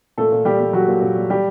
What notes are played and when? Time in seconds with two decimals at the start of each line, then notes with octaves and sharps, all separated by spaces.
0.18 A#2 A3 A4
0.32 A#2
0.45 G3 G4
0.60 G3
0.73 F#3 G3 F#4
0.88 A#2
1.02 A#2
1.16 G3
1.30 G3 G4